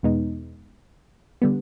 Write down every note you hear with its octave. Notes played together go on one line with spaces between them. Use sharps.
E2 B2 G#3 B3 D#4
D3 G3 B3